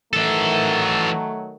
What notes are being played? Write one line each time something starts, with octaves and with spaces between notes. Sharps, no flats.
D#3 E3 F#3 A3 A4